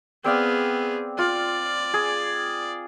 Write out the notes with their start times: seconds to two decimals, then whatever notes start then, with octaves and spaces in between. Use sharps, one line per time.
0.24 B3 C4 G#4 D5 F5
1.18 F4 D5
1.94 G#4